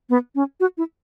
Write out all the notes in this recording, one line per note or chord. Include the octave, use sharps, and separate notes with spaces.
B3
C#4
F#4
E4